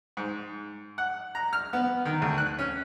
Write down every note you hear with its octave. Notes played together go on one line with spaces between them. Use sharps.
G#2
F#5
A#5
F6
B3
D#3
D2
F#6
C#4